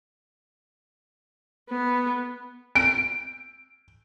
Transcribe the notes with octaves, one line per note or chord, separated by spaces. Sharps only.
B3
D7